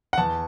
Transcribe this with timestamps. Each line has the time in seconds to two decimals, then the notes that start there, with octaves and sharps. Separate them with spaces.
0.13 F#5
0.18 E2 A5